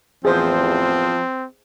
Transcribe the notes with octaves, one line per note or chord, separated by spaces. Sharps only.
A1 E2 F3 C4 G#4 C5